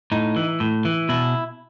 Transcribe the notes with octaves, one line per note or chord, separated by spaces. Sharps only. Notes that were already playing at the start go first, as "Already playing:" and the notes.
A2 D#4
E3
A2
E3
B2 E4